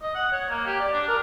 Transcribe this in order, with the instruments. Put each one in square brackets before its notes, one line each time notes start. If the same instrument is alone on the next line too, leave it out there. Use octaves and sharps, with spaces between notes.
[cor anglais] D#5
F#5
C#5
A#3
G4
D5
D4
A#4